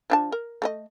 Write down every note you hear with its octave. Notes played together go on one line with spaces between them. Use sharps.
F3 D4 A5
A#4
A3 A4 D#5